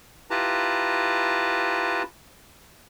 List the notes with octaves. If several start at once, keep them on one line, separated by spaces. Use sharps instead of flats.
E4 F4 G4 B4 A5 A#5